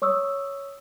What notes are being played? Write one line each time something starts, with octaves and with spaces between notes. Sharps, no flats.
C#5 C#6 D#6 E6